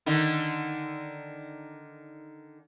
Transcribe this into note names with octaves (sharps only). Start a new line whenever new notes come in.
D3 D#3 D#4